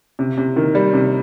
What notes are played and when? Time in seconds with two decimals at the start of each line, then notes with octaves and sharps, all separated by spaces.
0.19 C3
0.38 C3
0.56 D#3
0.75 G3
0.94 C3